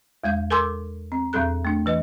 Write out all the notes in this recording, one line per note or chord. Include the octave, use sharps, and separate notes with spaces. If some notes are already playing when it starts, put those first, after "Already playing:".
E2 G#3 F5 G6
A4 A#4 G#5 C6 D6 E6
C4
E2 A#2 F#3 C4 A4 F#6
A3 D4
E3 B4 D#5